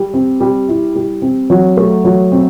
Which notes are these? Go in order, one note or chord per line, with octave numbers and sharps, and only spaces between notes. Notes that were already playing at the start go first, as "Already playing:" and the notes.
Already playing: G3
C4
G3
E4
G3
C4
F#3
A3
F#3
C4